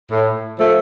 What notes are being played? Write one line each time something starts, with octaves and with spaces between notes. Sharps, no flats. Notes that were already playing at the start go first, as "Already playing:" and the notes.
A2
F3 A3